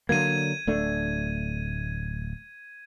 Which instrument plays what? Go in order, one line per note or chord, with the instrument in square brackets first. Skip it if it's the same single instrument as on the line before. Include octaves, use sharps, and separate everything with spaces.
[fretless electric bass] D3 F#3 A#3 [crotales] G#6 D#7
[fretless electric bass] D1 A3 D4